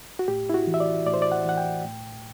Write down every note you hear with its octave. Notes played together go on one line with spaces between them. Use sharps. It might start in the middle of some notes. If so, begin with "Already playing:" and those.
F#4
A2 G4
E4
F#4
E3
E5
D5
A2 D5
C5
D5
F#5
E3 F#5
G5
A2